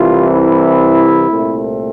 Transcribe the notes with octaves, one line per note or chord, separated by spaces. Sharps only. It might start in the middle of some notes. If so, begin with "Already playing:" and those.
Already playing: C2 C3 E3 F4
E4
C2 A#2 A3 C4